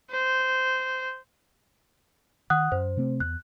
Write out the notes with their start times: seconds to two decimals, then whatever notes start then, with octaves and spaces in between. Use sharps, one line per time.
0.11 C5
2.50 D#3 F#5 D#6 F#6
2.72 F#2 C5
2.97 C3 A3 C4
3.20 E2 F#6